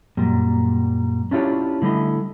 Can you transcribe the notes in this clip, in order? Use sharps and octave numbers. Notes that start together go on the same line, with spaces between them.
F#2 A#2 G3
C#4 D4 E4 F4 G4 C#5
D3 G3 A3 E4 D#5